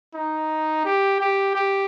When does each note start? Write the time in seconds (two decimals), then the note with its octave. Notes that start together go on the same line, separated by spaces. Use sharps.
0.15 D#4
0.85 G4
1.20 G4
1.55 G4